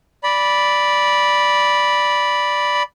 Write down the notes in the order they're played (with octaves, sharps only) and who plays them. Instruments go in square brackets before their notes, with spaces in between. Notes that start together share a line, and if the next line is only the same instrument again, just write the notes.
[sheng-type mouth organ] D5 B5